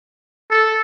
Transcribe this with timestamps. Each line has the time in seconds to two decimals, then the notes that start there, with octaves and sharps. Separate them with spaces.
0.51 A4